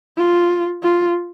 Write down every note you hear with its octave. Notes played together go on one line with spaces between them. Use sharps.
F4
F4